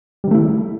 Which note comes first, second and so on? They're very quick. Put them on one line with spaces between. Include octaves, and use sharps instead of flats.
G3 D#3 A3 E4